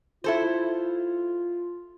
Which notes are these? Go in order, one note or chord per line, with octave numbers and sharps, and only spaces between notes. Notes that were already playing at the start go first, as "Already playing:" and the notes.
E4 F4 A4 C5